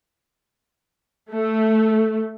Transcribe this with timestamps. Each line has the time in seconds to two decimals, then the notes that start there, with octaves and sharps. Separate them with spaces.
1.31 A3